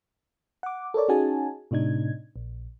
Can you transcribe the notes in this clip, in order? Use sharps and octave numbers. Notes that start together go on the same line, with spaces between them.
F#5 D6
A4 A#4 C#5 D5
C#4 D#4 F#4 G#4 G#5 A5
A2 C3 D4 D#4 G#6
A#1